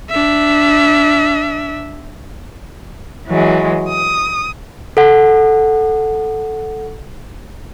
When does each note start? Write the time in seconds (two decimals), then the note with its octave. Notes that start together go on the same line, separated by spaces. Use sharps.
0.10 D4 E5
3.28 E3 F#3 G#3
3.90 D#6
4.97 A4 F#5